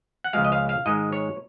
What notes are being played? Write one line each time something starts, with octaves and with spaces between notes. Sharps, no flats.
F#5
C#2 C#3 F3 G#3 F5
D#5
F5
F5
G#2 D#3 G#3 D#5
C#5